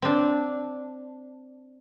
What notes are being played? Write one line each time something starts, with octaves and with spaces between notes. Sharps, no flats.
C4 D4